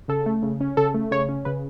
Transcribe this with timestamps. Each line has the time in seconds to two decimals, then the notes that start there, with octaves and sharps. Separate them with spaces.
0.08 C#3 A4
0.26 A3
0.43 C#3
0.61 C#4
0.77 C#3 A4
0.94 A3
1.11 C#3 C#5
1.29 C#4
1.45 C#3 B4